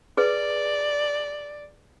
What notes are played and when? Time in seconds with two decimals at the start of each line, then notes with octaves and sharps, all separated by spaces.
0.17 G#4 B4 D5